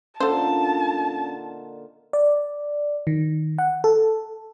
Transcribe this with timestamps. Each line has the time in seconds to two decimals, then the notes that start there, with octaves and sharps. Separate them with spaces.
0.20 A#2 D3 C#4 D#4 A4 C5 A5
2.13 D5
3.07 D#3
3.58 F#5
3.84 A4